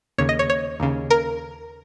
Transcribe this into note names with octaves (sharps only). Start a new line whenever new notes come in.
D#2 C#3 C#5
D#5
C#5
C#5
D#2 C#3
A#4